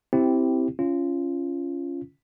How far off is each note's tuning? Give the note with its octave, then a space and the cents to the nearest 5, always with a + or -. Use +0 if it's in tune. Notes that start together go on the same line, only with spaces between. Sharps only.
C4 +0 E4 +0 G4 -5
C#4 +0 F4 -20